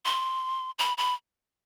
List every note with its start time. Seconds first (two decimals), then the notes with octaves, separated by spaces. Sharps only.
0.05 C6
0.79 B5
0.98 B5